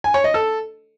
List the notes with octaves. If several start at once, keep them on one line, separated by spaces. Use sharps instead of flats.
G#5
C#5
D#5
A4